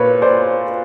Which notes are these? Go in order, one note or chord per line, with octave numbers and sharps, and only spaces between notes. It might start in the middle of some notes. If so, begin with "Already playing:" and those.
Already playing: A#2 B4 C#5
C5 D5